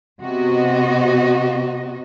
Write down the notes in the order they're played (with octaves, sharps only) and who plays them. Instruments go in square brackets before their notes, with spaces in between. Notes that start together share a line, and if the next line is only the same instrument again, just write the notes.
[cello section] C3 B3 F#4 D#5